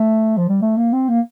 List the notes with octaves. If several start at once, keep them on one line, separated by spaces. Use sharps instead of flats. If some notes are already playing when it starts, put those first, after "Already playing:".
Already playing: A3
F3
G3
A3
A#3
C4
A#3